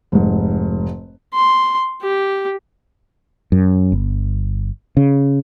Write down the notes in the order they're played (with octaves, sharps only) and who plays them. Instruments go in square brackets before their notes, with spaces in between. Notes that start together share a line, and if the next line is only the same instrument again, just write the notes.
[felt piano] F1 G#2
[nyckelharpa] C6
G4
[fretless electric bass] F#2
G1
C#3